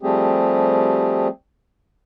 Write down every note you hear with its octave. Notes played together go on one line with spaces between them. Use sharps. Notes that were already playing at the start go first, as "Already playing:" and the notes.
F3 G3 A3 C4 G4 G#4